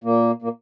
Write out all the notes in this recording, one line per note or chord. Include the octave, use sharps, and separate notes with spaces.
A#2 A#3
A#2 A#3